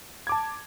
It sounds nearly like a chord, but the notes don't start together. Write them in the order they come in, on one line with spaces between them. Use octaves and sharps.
G#6 D6 A5